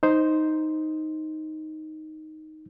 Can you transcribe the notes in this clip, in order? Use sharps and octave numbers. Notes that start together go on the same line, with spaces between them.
D#4 C5